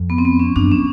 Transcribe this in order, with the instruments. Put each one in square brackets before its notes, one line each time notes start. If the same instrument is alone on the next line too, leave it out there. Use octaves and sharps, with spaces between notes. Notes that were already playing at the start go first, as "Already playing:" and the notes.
Already playing: [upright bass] F2
[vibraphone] B3
C4
B3
C#4
[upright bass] F#2 [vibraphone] D4
[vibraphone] C#4